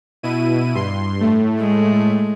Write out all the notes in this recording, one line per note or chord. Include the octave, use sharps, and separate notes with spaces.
B2 E4 D#7
G2 C6
A2 A3
G#3